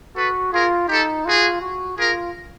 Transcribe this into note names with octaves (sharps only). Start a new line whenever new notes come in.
F#4 A4 B4
F4 G#4 A#4
D#4 G4 A4
F4 F#4 G#4
F#4
F4 G#4 A#4